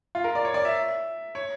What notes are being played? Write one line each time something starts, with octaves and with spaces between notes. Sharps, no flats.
F4
A#4
D5
C#5
D5
E5
C#5